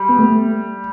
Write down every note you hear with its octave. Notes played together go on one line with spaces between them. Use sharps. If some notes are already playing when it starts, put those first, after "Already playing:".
Already playing: G3
B3
A3